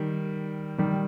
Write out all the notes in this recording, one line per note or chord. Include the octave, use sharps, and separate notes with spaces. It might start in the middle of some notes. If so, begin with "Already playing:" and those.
Already playing: D#3 G3
D#3 G3